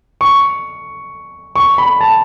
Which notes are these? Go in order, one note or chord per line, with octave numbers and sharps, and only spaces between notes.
C#6
C#6
B5
A5